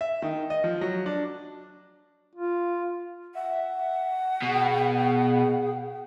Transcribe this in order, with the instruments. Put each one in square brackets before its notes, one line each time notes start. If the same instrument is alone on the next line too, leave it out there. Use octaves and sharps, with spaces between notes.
[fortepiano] E5
D#3
D#5
F3
F#3
D4
[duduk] F4
[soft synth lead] E5 [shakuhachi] F#5
[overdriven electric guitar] B2 [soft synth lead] G#4